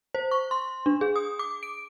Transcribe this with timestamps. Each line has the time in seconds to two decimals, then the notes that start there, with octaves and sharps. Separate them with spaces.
0.15 C5
0.31 C#6
0.51 C6
0.86 D4
1.01 G#4
1.16 D#6
1.39 D6
1.63 D7